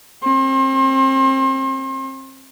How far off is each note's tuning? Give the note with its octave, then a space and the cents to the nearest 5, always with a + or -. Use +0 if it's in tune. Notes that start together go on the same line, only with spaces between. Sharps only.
C4 +30 C6 +40